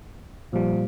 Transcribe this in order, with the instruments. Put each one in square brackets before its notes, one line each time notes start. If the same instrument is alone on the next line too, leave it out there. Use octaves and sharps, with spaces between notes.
[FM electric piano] A#2 G3 [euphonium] F3